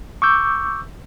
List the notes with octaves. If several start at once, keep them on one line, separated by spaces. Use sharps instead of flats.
C#6 D6 E6 G6